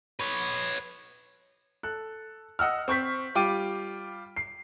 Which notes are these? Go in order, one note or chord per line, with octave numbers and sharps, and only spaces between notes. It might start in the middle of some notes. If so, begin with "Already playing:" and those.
B4 C#5
A4 F#6
D#5 F#5 E6 F6
C4 C#6 G6 B6
G3 F4 G5 D6 D#7
C7